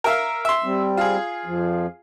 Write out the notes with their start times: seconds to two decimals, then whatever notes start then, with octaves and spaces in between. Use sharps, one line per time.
0.04 A#4 E5 F5
0.45 E5 C6
0.64 G3 C4
0.97 F4 G#4
1.46 F2 F3